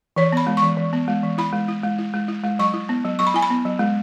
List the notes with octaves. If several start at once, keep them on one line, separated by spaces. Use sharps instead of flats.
E3 C#5
B3 B5
G#3
C#6
E3
E3
B3
G#3
E3
E4 B5
G#3
E4
G#3
E4
G#3
E4
G#3
F#3 C#6
E4
B3
F#3
F#3 C#6
B5
E4 G#5
B5
B3
F#3
G#3